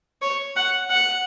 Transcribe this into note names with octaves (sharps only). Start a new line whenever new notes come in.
C#5
F#5
F#5